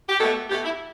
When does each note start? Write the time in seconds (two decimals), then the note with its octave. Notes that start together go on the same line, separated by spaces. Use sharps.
0.09 G4
0.19 B2 A3 A4
0.49 B2 G4
0.52 A3
0.64 E4